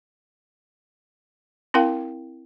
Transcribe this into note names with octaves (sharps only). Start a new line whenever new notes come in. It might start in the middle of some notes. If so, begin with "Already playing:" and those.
C4 E4 A#4 F5 G5